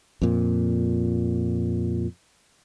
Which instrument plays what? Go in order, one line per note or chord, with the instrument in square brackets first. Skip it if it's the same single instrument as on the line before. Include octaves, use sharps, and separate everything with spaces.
[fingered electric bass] F2 A#2